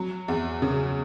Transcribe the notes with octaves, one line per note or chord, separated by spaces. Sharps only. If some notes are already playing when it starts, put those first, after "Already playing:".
Already playing: F#3
E2
C#3